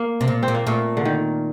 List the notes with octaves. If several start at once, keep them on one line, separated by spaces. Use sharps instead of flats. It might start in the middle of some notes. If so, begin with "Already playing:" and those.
Already playing: A#3
C3
A#2
C4
A#2
A#3
A#2 A3
D3
D#3